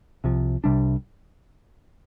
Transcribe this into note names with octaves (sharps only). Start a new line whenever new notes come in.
C2 C3 F3
C2 C3 G3 D4